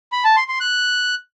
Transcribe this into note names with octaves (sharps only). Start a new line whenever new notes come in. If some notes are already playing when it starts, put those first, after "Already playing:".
B5
A5
C6
C6
F#6